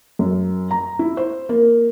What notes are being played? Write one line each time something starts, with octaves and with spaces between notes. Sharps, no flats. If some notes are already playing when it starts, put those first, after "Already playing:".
F#2
A#5
E4
C5
A#3